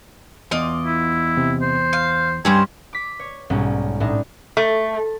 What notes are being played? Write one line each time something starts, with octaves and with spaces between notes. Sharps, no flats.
E2 F4 D#5 D6
E4
C3
C5
F5 G6
G2 G3 C4 C#4 G4 C5 G#5
D6 B6
C#5
B1 G#2 G3 C#4
A2 D4 D#4
A3